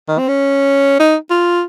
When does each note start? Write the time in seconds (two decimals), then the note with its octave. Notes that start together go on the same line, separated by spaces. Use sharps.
0.09 D#3
0.19 C4
0.28 C#4
1.00 D#4
1.30 F4